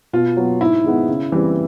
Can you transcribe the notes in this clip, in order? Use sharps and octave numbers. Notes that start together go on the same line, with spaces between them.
B2 F4
F#3 B3
G#2 E4
D#3 G#3 B3
C#3
E3 G3 C4